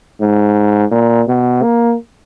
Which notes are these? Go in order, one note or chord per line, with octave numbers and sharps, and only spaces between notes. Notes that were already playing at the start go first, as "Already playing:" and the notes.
G#2
A#2
B2
A#3